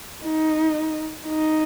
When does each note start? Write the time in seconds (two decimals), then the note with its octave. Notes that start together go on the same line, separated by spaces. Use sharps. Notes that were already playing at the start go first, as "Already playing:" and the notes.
0.24 D#4
1.27 D#4